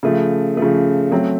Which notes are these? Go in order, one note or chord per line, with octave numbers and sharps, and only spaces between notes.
C#3 F3 A3
C#3 F3 A3
F#3 A3 C4